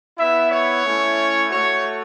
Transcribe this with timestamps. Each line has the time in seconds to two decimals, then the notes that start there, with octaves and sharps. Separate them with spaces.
0.18 B3 E4 E5
0.51 C#5
0.85 A3 C#4 E4
1.50 A3 F#4 C#5